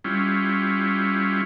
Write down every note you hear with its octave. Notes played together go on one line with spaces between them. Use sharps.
G3 C#4 E4 F4